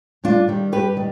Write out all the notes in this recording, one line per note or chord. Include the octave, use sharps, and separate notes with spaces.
G2 D4 F4
D#3 G3
G2 G4 B4
D#3 G3